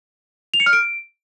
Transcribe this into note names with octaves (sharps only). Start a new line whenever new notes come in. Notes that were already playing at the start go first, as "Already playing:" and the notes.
F7
C#7
F6
D7